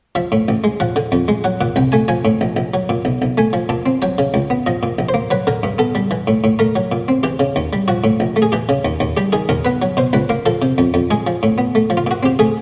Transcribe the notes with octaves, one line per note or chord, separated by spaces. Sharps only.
F3 E5
A2
A1
G#3
F3 F#5
D3
F2
G#3
F#3 F#5
A#2 F#5
C2 G5
A3 G#5
F3 G#5
A2
A#1
A#1
F#3
A#2
B1
B1
A3 G#5
F3
A#2 A5
C4
F#3 G5
C#3
C#2
B3
F3 D#5
A#2
A#1
C5
A#3
F#3 B4
D3 A#4
G2
B3 A4
G3
E3
A2
A2
A3 A#4
F#3
A#2
C4
E3 G4
C#3
D#2
G3
F3 F#4
A2
A#1
A3
G#4
E3 G4
C#3
D#2
D#2
G3 G4
D#3 G#4
D#2 A#4
B3 B4
F#3
B2 C5
C#2 B4
A#3 A#4
F3 A4
C3
F2
F2
G#3 G#4
F3
A2
B3
A3
F3
F4
A#2 F#4
C4 G4
A3 G#4